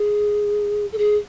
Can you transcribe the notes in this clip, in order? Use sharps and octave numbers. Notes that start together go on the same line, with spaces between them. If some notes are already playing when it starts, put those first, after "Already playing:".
Already playing: G#4
A4
G#4